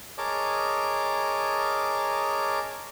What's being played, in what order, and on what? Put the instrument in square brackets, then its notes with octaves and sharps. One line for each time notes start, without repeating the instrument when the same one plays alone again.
[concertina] G#4 A#4 C#5 D#5 A5 D6